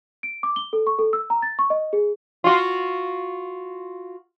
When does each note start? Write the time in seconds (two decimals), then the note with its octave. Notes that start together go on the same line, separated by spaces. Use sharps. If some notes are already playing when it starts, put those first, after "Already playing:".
0.23 D7
0.43 D6
0.56 G7
0.73 A4
0.87 C#6
0.99 A4
1.13 E6
1.30 A#5
1.42 A6
1.59 C#6
1.70 D#5
1.93 G#4
2.44 F4 F#4